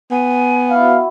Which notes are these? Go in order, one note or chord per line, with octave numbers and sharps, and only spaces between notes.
B3 G#5
E4 F#4 F5